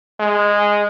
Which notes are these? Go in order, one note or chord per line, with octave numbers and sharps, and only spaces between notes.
G#3